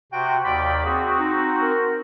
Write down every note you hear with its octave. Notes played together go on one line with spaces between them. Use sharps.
C3 F#4 G5
D#2 D5 G5 B5
C4 F#4 G#4
D#4
A#4